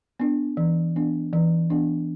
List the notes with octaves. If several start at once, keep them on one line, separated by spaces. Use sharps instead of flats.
B3 D4
E3
B3 D4
E3
B3 D4